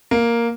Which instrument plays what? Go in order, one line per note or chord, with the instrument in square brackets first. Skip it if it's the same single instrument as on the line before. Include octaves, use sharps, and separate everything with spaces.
[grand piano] A#3